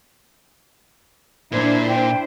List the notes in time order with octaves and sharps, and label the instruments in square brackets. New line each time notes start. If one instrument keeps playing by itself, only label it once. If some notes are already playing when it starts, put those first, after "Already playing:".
[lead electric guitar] A#2 [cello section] D4 E4 C5 [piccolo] G#6
[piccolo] G5